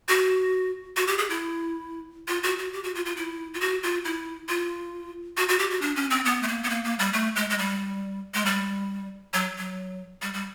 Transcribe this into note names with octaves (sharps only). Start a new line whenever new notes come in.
F#4
F#4
G4
G#4
E4
F4
F#4
F#4
G4
F#4
F4
F4
E4
F4
F#4
F4
E4
F4
F#4
F#4
G4
F#4
D4
C#4
C4
B3
A3
A#3
B3
A#3
A#3
G3
A3
G#3
G#3
G3
G#3
G3
F#3
F#3
G3
G3